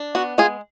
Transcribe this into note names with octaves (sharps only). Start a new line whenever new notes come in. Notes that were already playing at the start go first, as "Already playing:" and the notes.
Already playing: D4
B3 F#4
G#3 F4 G#4